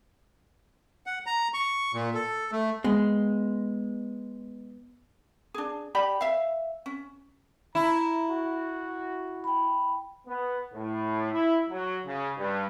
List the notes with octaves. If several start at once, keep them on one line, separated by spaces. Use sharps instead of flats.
F#5
A#5
C#6
A#2
A4
A3
G#3 B3
D4 G#4
G4 D5 B5
E5 F5
C#4
E4 A#5
F#4
G5 B5
B3
A2
E4
F#3
C#3
G2